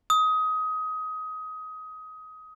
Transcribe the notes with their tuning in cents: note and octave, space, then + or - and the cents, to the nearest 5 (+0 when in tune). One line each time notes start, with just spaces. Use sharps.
D#6 +20